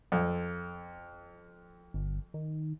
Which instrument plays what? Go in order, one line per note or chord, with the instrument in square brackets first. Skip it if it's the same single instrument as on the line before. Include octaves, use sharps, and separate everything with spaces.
[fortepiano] F2
[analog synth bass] G1
D#3